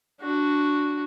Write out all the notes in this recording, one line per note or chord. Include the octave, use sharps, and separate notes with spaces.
D4 F#4